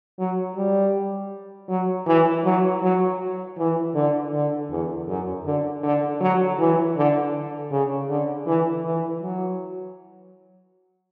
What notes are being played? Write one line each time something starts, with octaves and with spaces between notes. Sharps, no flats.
F#3
G3
F#3
E3
F#3
F#3
E3
D3
D3
E2
F#2
D3
D3
F#3
E3
D3
C#3
D3
E3
E3
F#3